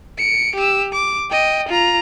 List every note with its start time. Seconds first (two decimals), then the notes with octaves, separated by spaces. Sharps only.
0.18 C#7 D7
0.56 G4 E6
0.93 D6
1.31 D#5 G5
1.69 F4 A#5